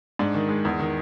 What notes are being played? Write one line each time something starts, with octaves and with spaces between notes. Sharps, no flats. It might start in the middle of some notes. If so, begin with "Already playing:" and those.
G#2 D4
D#3
G#3
E2
D#3